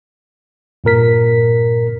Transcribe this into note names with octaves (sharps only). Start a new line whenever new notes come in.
G2 A#2 A#4 B6